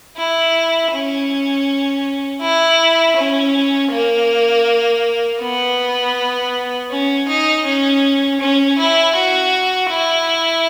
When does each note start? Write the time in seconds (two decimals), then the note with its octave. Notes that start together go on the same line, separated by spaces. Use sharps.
0.17 E4
0.92 C#4
2.41 E4
3.16 C#4
3.91 A#3
5.41 B3
6.91 C#4
7.28 D#4
7.65 C#4
8.40 C#4
8.78 E4
9.15 F#4
9.90 E4